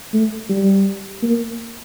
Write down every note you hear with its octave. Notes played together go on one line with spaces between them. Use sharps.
A3
G3
A#3